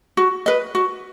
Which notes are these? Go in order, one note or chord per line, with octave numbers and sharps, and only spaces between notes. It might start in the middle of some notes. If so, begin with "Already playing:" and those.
F#4
B4 D#5
F#4